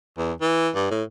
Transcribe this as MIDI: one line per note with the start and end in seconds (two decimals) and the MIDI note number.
0.18 0.33 40
0.41 0.69 52
0.75 0.89 43
0.91 1.03 45